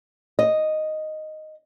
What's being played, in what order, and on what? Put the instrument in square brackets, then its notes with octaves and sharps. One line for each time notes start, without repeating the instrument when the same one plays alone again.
[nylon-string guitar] D#5